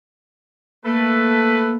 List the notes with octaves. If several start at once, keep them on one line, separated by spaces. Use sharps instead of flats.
A3 A#3 A4 B4